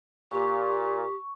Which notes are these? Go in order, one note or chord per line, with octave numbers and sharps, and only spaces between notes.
A#2 G4 C#6